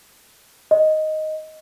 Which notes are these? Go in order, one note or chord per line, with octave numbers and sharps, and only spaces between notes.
D#5